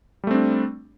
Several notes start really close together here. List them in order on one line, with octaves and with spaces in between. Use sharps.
G3 A3 C4 D4